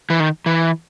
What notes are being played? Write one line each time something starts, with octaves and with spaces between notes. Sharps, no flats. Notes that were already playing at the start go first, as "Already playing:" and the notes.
E3
D#3
E3